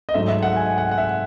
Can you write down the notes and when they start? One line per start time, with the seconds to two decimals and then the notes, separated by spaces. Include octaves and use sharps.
0.09 D#5
0.14 G#2 F#3 A3 E5
0.28 E5
0.43 F#5
0.56 G#5
0.78 F#5
0.91 F#5
0.98 E5